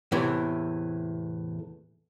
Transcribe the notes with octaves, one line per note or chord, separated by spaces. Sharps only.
E2 A2 C3 E3